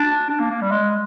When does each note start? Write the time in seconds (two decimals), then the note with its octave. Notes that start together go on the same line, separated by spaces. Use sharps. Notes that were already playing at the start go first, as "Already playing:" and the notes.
Already playing: D4
0.30 D4
0.40 A#3
0.51 A#3
0.62 G3
0.72 G#3